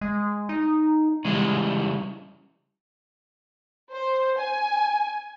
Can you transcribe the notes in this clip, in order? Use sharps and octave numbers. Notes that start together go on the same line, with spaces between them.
G#3
D#4
C#3 E3 G3 G#3
C5
G#5